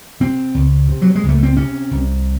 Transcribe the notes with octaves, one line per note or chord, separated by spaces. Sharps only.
C3 C4
C#2
C3
F#3
G#3
C#2
A3
C4
C3 C#4
C2